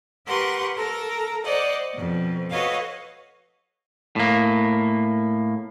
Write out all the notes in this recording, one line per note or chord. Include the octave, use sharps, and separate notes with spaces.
G4 A#4 B4 F#5 C6 C#6
A4 A#4 A#5
C5 D5 D#5 F#5
F2 B2
F#4 A4 B4 C#5 D#5 F5
A2 A#3